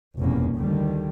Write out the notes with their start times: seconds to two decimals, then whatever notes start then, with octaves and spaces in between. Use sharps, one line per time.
0.19 F1 E2 G2 B2 A#3 C#4
0.57 D2 D3 D#3 G3